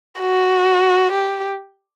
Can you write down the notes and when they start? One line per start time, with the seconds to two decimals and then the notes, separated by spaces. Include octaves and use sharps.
0.20 F#4
1.12 G4